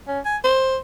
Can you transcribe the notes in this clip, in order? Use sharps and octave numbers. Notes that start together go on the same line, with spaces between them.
C#4
G#5
C5